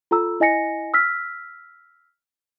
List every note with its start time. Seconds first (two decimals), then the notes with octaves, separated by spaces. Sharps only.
0.11 F4 A4 A#5 E6
0.40 E4 D#5 G#5 A#6 C#7
0.94 E6 F6 B6